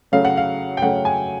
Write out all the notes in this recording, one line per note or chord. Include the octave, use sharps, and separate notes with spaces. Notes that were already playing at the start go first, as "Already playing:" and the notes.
C#3 F#3 A3 C#4 F5
F#5
F5
G5
C#3 F#3 A3 C#4 F#5
G#5